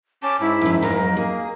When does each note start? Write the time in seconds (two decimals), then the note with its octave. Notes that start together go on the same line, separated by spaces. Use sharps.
0.23 C#4 A5 D6
0.40 G#2 E4
0.61 F#2 F3
0.82 F2 F#3 D#4 A#4
1.17 A#3 G#4